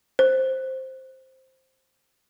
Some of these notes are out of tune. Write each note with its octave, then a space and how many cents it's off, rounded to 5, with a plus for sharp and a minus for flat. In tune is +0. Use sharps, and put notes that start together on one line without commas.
C5 +5